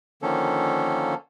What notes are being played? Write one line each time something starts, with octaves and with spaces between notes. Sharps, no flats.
D3 D#3 F3 A#3 C#4 A4